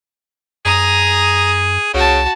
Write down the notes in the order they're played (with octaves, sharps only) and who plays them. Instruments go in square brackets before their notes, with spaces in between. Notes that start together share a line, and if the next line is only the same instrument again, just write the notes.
[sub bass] F#2 [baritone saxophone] G#4 [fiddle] A#5 D#6
[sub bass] C2 [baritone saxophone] C#3 [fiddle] F#4 A5